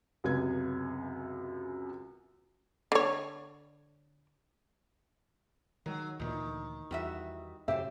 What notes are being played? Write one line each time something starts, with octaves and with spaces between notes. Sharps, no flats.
C#2 F#2 C3 B3 G#6
D3 C#5
D#3 F#3 G#3
D2 A#2 D#3 E3
E2 G3 F#4 E5
F#2 A2 C#3 G4 C5 E5